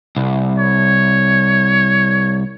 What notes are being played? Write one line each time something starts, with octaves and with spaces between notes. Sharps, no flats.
C2
C#5